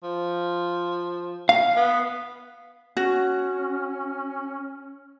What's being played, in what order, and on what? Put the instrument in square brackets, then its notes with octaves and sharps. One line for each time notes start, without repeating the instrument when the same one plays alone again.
[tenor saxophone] F3
[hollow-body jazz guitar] F5
[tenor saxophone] B3
[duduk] C#4 [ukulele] F#4